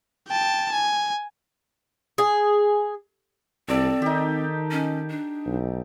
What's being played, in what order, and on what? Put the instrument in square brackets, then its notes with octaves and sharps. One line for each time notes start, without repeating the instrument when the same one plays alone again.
[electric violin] G5 A5
G#5
[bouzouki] G#4
[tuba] C2 [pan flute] C4 [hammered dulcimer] A4 D5 A5
[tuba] D#3 [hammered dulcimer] D#4 G4
[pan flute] C#4
D4
[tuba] B1